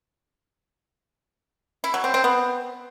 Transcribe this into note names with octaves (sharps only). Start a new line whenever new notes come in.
E4
F#3
C4
C4
B3